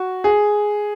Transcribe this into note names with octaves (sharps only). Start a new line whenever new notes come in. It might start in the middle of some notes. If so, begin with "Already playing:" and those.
Already playing: F#4
G#4